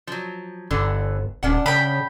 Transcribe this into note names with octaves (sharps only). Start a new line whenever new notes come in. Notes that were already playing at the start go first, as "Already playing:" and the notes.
F3 F#3
G1 D3 E3 B3
D#1 C#4 D4 F#5
C#3 G5 B5